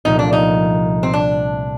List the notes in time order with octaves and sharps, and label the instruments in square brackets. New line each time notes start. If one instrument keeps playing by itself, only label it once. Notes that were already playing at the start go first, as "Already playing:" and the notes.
[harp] C2 A#2 F3 A3 [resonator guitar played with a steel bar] D#4
[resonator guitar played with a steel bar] D4
D#4
C4
D4